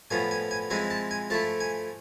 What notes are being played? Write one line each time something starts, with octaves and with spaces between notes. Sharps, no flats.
A2 F3 B3 F4 G#5
G#5
G#5
F3 G#3 C4 E4 G#5
A5
G#5
F3 A3 E4 A5
G#5